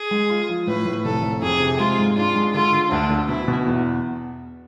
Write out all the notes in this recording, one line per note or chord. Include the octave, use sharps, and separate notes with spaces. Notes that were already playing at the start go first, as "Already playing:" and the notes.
Already playing: G#4
G#3
F4
F3
A2 B4
A2
F1 A4
F1
F2 G#4
C3
G#3 F4
G#2
D4 F4
G#3
D3 F4
D3
D2 D4
D3
B2 E4
B2
E2